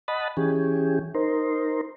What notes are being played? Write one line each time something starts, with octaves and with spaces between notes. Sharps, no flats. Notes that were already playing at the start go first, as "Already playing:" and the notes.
D#5 F#5 A5 B5
E3 C#4 G4 G#4
D#4 A#4 C5